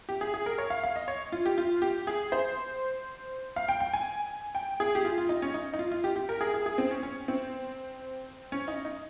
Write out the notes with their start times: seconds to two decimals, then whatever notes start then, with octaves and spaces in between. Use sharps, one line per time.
0.09 G4
0.21 G#4
0.34 G#4
0.46 A#4
0.58 C#5
0.70 F5
0.83 F5
0.96 D#5
1.08 C#5
1.32 F4
1.46 G4
1.58 F4
1.82 G4
2.07 G#4
2.32 C5
3.56 F5
3.69 G5
3.81 G5
3.93 G#5
4.55 G5
4.80 G#4
4.95 G4
5.05 F4
5.18 F4
5.29 D#4
5.42 C#4
5.54 D#4
5.74 D#4
5.79 F4
5.92 F4
6.04 G4
6.16 G4
6.29 A#4
6.41 G#4
6.54 G#4
6.66 G#4
6.78 C4
6.91 C#4
7.03 C#4
7.28 C4
8.52 C#4
8.68 D#4
8.85 D#4